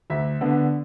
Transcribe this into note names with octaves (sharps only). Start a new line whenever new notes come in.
D2 E5
D3 B3 D4